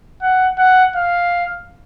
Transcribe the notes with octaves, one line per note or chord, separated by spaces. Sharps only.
F#5
F#5
F5